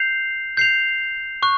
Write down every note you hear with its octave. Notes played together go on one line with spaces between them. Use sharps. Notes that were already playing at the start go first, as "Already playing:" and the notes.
Already playing: G6 C7 F7
G6 C7 F7
C#6 F#6